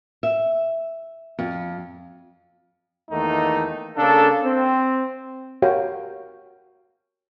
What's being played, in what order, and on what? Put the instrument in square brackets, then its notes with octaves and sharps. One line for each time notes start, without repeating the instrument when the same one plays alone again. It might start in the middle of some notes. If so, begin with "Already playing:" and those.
[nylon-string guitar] E5
F2
[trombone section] E2 D#3 A3 A#3 D#4
C#3 A#3 D4 A4
C4
[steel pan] F#4 G4 A#4 C#5 F5 G5